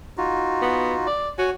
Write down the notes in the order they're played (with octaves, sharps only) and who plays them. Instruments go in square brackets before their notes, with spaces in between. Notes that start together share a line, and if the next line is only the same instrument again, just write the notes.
[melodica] D#4 F4 F#4
[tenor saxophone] B3
D5
[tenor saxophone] F#4 [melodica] C#5 G#5